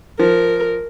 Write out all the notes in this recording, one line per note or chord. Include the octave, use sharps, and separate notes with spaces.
F3 A#4